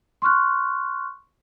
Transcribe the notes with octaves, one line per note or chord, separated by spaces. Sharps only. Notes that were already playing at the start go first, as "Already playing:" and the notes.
C6 C#6 F6 F#6